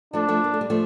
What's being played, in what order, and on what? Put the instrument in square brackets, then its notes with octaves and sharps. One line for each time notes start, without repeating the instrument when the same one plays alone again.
[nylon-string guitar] F3 A3 [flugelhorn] D4
[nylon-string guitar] F3 A3
A#3
A3
G3
F3 A3